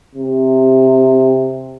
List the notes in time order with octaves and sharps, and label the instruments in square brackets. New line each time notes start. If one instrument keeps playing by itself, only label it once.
[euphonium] C3